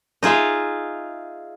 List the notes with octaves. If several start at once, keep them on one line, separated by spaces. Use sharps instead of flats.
D#4 F4 G#4 E5 F5